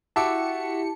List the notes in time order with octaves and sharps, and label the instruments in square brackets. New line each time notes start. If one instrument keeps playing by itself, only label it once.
[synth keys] E4 G4 C#7 [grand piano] F#4 E5 D6 [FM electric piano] A5